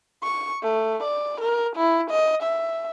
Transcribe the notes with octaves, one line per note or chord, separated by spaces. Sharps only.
C#6
A3
D5
A#4
E4
D#5
E5